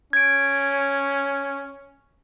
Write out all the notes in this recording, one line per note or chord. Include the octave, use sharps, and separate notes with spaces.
C#4 G#6 D7